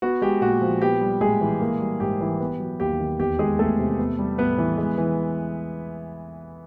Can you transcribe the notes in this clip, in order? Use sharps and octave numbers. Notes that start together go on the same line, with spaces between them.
B3 F#4
G#3 G4
A#2 F#4
F3
B3 G4
G3
A2 G#3 G#4
E3
A#3
G3
G#2 G4
E3
B3
F#3
D#2 G4
D#3
E2 G4
D#3 G#3 G#4
E2 A3 A4
C3
B3
G3
A2 B3 B4
E3
G#3
E3